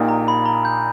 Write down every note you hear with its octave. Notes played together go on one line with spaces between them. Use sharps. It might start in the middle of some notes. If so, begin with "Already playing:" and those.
Already playing: A#1 A#2 A#3 D#4 G4
A#5
B5
A#5
G6